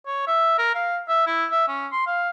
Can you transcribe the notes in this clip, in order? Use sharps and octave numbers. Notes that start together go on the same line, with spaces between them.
C#5
E5
A#4
F5
E5
E4
E5
C#4
C6
F5